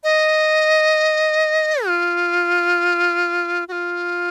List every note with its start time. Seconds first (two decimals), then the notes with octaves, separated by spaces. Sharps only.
0.04 D#5
1.86 F4
3.68 F#4
3.72 F4